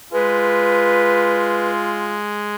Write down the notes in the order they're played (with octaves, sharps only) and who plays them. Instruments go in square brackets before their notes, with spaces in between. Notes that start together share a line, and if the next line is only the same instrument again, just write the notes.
[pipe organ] G#3 [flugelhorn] F4 [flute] B4